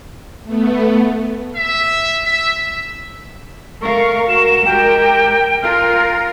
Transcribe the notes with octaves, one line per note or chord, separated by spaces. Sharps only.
A3 B3
E5
E5
A3 A#4 F5 C#6
F#4 A#4 E7
G#3 G4 A#4 G5
F4 A#4 F6